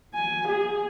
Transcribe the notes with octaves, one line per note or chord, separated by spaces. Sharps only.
G#5
G#4